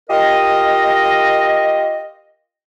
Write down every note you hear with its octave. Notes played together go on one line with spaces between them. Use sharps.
F4 G4 A#4 D#5